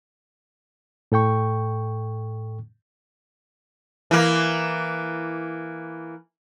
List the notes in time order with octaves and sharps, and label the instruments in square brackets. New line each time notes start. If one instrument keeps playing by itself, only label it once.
[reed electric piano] A2 A4 G5 C#6
[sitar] E3 A#3